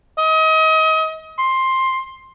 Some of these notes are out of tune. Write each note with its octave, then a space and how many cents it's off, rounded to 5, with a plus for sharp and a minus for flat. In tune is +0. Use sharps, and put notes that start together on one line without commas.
D#5 +30
C6 +10